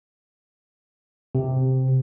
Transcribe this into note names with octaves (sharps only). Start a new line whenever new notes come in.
C3